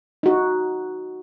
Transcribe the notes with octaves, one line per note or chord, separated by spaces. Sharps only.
D#4 F#4